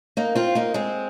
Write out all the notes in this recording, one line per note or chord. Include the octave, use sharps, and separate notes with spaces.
A#3 D#4
C4 F4
A#3 D#4
G#3 C4